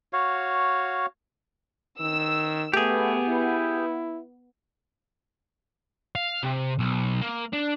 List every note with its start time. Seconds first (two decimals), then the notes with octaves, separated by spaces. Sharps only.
0.13 F#4 C#5 F5
2.00 D#3 E6
2.74 A3 B3 G4 G#4
3.28 E4
6.15 F5
6.43 C3
6.79 B1
7.22 A#3
7.53 D4